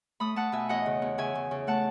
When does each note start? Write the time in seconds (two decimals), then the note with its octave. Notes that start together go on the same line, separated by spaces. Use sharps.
0.20 A3 B5 D#6
0.36 A3 F#5 A5
0.52 B2 E5 G#5
0.69 E2 D#5 F#5
0.86 C#3
1.02 E2
1.18 C#3 E5 G#5
1.35 C#3
1.51 C#3
1.67 A3 F#5 A5